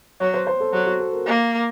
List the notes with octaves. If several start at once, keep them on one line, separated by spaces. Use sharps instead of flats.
F#3 C#5
C5
C5
A4
F#3 A4
F#4
A4
A#4
A#3